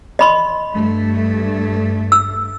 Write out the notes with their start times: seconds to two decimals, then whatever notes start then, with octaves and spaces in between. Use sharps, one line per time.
0.19 D#5 B5 C6
0.74 G2 A3
2.12 E6